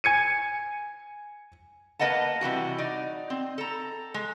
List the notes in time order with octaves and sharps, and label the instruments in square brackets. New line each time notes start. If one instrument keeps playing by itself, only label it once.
[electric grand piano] G#5 G#6 C#7 D#7
[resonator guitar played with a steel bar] A#3 B4 D#5 F#5 A5
C3 E3 G3 F#4
D#4 D5
C4
A4 A#5
G#3